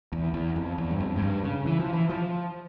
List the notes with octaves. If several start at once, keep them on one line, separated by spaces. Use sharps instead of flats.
E2
E2
F2
E2
G2
F2
G#2
G2
C#3
E3
F3
E3
F3